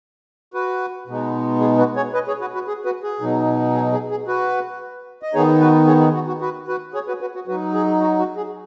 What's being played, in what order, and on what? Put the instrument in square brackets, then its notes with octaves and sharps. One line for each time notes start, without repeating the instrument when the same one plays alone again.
[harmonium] F#4 B4
B2 G#3 B3 D#4
G#4
F#4 B4
G#4 C#5
B4 D#5
G#4 C#5
F#4 B4
F#4 B4
G#4
F#4 B4
G#4
B2 F#3 D#4
G#4
G#4
G#4
F#4 B4
D#5
D#3 B3 D#4 G#4 C#5
F#4 B4
G#4 C#5
G#4
F#4
F#4
F#4 B4
F#4 B4
G#4 C#5
F#4 B4
F#4 B4
F#4
F#3 F#4 B4
D#4
G#4
F#4
F#4
G#4